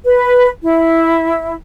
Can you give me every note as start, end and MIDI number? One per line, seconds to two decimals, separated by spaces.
0.05 0.47 71
0.62 1.52 64